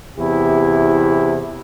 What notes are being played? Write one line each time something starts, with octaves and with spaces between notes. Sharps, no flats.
E2 C3 E4 G4